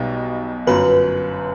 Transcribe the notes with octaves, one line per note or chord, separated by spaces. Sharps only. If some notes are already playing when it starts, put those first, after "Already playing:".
Already playing: B1 B2 G3 D#4 G4
G1 F#2 F#3 B4